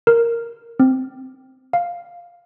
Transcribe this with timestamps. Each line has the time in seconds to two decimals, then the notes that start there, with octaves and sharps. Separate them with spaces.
0.07 A#4
0.80 C4
1.73 F5